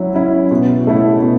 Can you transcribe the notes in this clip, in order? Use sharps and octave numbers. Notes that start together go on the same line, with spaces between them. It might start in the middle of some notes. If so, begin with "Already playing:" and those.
Already playing: F#3 C#4 E4
C#4 E4
B2
A3 C#4 E4
B2